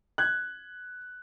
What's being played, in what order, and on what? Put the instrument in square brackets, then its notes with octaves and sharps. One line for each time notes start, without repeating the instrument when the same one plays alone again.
[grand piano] F#6 G#6